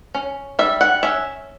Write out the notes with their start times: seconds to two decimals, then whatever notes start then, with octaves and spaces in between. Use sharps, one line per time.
0.15 C#4
0.59 G3 E5
0.81 F#5
1.03 C#4 E5